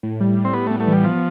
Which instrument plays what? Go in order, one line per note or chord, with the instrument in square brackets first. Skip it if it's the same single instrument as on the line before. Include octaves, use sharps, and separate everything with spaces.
[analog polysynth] A2
G3
A2
[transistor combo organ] C4
[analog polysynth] G3 [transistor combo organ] B3
[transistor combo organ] A3 [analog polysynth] B3
[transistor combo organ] A3
[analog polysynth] E3 [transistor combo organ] G3
[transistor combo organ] F3 [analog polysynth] B3